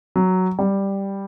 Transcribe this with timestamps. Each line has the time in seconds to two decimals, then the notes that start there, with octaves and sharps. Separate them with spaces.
0.16 F#3
0.59 G3